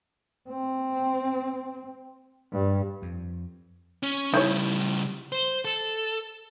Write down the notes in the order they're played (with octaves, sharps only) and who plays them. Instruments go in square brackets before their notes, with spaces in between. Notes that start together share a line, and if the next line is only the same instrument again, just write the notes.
[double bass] C4
G2
[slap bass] F2
[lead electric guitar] C#4
[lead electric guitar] C#3 G3 [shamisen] D#4 E4 C#5
[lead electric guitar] C5
A4